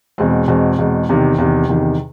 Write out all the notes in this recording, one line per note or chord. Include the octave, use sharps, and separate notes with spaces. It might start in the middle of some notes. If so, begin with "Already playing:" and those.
E2 B2 G#3 C4
E2 B2 G#3 C4
E2 B2 G#3 C4
E2 C3 D#3
E2 C3 D#3
E2 C3 D#3